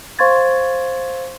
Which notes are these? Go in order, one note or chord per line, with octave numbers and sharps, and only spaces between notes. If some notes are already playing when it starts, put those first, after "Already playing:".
C5 F5 C6 C#6 G#6 A6